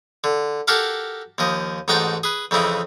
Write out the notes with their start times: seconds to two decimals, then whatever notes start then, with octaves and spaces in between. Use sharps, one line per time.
0.24 D3
0.68 F#4 G4 A4 A#4 F5
1.38 D#2 F3 D#5
1.88 A1 G#2 D#4 F#4 G5 A5
2.23 G#4 B4
2.51 F2 C#3 E3 D#4 E4